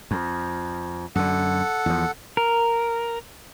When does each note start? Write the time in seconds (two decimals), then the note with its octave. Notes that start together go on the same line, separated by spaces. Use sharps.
0.11 F2
1.15 F#2 D3 A4 F#5
1.86 E2 F3
2.37 A#4